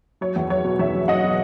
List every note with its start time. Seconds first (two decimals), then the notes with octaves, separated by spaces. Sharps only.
0.21 F#3 C#5
0.36 E2
0.50 F#3 C#5
0.64 B2
0.79 E2 C#5 E5
0.94 F#3
1.08 F#3 D#5 F#5
1.23 B2